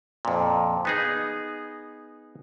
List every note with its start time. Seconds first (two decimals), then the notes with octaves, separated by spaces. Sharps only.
0.25 F2 A#2
0.85 B3 D#4 G#4